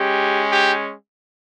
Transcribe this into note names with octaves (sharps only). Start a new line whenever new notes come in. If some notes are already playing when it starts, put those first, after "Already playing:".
Already playing: G#3 C#4 G4
G4